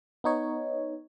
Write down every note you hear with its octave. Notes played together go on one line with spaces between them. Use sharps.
B3 D#4 C#5